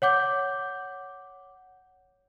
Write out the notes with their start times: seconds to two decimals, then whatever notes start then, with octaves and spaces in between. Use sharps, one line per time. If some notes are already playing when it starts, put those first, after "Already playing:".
0.02 C#5 F#5 D6 G6